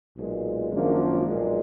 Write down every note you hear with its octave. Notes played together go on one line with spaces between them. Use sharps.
B1 A#2 G#3
G#1 F#2 F3 A#3 D4
B1 A#2 G#3